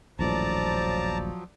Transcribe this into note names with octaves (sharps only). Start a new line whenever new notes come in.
D#1 A#1 A2 F3 F#3 D5 A5 A#5